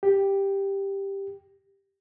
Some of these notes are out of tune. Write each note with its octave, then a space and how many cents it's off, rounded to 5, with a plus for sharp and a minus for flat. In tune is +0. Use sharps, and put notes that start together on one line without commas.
G4 +5